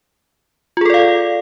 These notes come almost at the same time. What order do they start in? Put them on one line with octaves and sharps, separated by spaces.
F4 G#4 A4 D5 F5